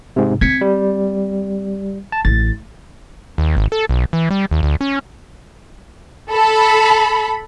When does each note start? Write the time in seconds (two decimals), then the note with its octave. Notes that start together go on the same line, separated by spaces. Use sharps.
0.16 G#2 C3
0.41 C4 G#6 B6 C#7
0.61 G3
2.12 A5
2.25 A1 A6
3.38 D#2
3.57 G#1
3.72 A4
3.89 B1
4.13 E3
4.31 G3
4.51 D#2
4.63 D2
4.81 C#4
6.31 A4 B5